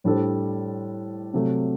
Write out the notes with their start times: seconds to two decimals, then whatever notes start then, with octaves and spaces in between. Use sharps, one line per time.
0.04 A2 G3 D4 A4 C5
1.34 C3 F#3 A3